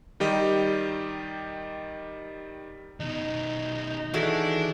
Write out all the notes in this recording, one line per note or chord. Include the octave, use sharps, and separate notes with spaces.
D#3 G3 G4 D#5
B2 D#3 D#4
D#3 E3 D4 E4 F#4 G#4 A4